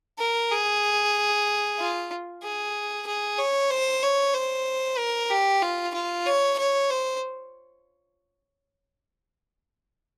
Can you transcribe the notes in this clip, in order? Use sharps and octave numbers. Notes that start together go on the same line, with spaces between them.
A#4
G#4
F4
G#4
G#4
C#5
C5
C#5
C5
A#4
G4
F4
F4
C#5
C#5
C5